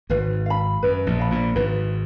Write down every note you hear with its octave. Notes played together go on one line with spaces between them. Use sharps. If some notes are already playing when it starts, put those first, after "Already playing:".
G#1 G#2 B4
F5 B5
F#2 B4
A#1 A#2
F5 B5
A#1 A#2
G#1 G#2 B4